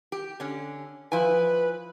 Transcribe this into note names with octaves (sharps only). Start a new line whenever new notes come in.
G4
D3 C#4
F3 E4 B4 G#5